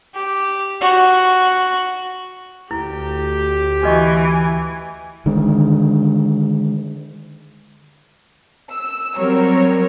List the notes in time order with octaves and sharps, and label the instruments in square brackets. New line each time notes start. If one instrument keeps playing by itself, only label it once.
[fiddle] G4
F#4
[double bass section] D2 [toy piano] E4 [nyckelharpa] G4
[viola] E3 G#5 [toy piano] F#4 D#5 C#6
[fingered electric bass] D3 D#3 G#3 D4
[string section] E6
F#3 G3 C4 A#4 C#5